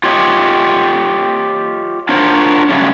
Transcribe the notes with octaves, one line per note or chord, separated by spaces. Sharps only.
F4 G4 C#5 D#5
D4 F4 F#4 A#4 C5 C#5
C#3 F#3 G3 A3 C#4